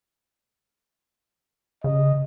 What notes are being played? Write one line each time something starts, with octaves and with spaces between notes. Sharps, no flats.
C#3 D#5